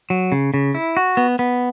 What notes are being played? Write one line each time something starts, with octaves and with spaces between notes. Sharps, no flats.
F#3
C#3
C#3
E4
F#4
B3
B3